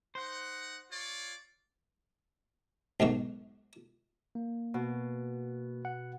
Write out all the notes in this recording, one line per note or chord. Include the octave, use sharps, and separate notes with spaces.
D#4 C5 F#5
F4 C#5 D5
B1 G#2 D#3 C#6
A#3
B2
F#5